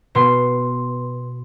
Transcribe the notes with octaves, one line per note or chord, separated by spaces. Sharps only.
B2 B3 C6